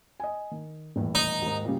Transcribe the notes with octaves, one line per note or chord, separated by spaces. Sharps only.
D#5 G#5
D#3
D#1 E2 A2
D#4
D#2 G#2
A#2 C#3 G3